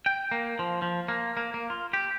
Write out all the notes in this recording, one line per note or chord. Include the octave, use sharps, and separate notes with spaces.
G5
A#3
F3
F3
A#3
A#3
A#3
F4
G4